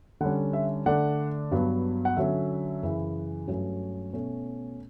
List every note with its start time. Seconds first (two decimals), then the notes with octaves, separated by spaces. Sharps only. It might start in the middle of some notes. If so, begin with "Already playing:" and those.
0.21 D3 G3 C#4 F#5
0.53 E5
0.86 D3 A3 D4 F#5
1.51 G2 F#3 B3
2.05 F#5
2.17 D3 F#3 C#4 E5
2.83 F#2 C#3 E3
3.47 G2 F#3 A3 C#4
4.13 B2 A3 C#4